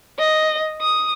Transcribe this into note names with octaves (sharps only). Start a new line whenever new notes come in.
D#5
D#6